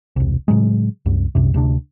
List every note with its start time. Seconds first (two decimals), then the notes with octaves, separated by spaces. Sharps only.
0.16 E1 C2
0.48 A2 C#3 F#3 G#3
1.06 C2 F#2
1.35 C2 F#2 C3
1.54 D2 C3 D4